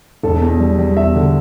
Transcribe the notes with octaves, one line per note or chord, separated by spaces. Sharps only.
E1 A4
E2
G3
G3
E2 E5
D3